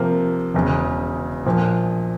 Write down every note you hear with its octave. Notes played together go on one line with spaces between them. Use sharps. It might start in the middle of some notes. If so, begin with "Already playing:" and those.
Already playing: C3 F3 A#3
E1 E2 C#3
A#1 A#2 F3